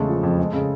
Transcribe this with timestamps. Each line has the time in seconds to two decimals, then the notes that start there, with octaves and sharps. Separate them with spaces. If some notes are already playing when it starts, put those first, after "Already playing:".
Already playing: E2 C#3 G#3 A3 A4
0.09 F3
0.23 F2
0.39 G#3
0.53 C#3